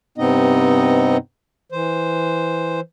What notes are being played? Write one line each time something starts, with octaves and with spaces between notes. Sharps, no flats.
G2 C3 B3 C4 D#4 D#5
E3 C5